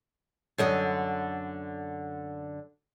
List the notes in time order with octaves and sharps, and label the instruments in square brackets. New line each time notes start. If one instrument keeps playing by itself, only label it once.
[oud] F#2 D3 D#5